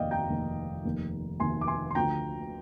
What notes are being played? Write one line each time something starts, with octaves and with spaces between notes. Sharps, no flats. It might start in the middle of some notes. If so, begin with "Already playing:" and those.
Already playing: F1 D#2 D#3 D5 D#5 F5 G5
G5 A#5
F1 D#2 D#3
F1 D#2 D#3
F1 D#2 D#3 G#5 C6
D6
G#5 C6
C6
D2 D3 F3 G5 A#5